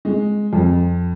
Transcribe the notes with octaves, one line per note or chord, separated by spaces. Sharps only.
G#3
F2